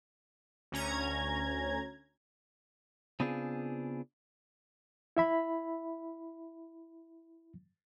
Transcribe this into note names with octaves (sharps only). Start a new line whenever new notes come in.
D2 C#4 A#5 G#6
C#3 B3 C4 D4 F4 G#4
E4 E5 B5